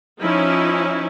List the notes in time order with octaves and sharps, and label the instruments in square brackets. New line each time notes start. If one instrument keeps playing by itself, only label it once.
[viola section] F3 C#4 D#4 E4